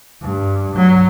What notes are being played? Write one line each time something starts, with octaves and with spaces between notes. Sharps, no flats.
G2
F#3